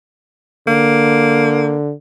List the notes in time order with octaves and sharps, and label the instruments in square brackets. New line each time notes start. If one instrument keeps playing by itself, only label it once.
[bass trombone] D3 [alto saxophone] A#3